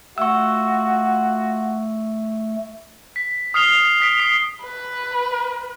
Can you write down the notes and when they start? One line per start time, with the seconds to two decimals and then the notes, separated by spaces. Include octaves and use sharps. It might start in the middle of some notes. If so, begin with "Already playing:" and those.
0.18 A3 F4 F#4 C#6 E6
3.16 B6
3.54 D#6 F6 C7 F7 G7
3.78 D#6
4.00 D#6 B6 D7
4.20 D#6 C7
4.63 B4